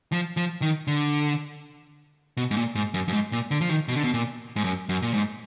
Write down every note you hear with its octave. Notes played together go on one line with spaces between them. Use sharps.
F3
F3
D#3
D3
B2
G#2
A#2
G#2
F#2
F#2
G#2
A#2
D3
F3
D#3
B2
D3
B2
A#2
G#2
F#2
F#2
A#2
G#2